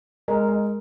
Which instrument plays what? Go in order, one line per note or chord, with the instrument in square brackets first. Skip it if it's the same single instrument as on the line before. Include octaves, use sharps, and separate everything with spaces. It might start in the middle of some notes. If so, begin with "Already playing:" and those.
[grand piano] G#3 [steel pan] A#4
[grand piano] G#3